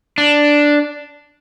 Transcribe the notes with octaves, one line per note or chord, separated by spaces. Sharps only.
D4